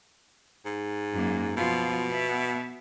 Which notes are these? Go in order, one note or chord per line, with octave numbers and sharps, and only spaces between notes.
G#2
F#2 A#3
B2 F3 F4
B3 E5